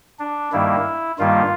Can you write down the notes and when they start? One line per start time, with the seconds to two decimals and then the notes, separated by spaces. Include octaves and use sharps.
0.19 D4
0.52 G2 D#3 G3 A#3 E4
1.19 G2 D#3 G3 A#3 F4